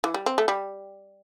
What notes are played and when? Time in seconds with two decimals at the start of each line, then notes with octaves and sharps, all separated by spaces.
0.04 E3
0.14 G3
0.26 C4
0.38 A3
0.48 G3